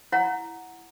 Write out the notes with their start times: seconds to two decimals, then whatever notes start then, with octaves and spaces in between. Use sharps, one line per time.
0.12 E4 C#5 F#5 A#5